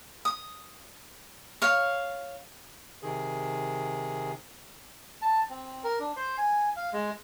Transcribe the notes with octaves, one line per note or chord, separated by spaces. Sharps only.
D#6
C#5 F5
C3 D#3 G#4
A5
C4
A#4
D4
C5
G#5
F5
G#3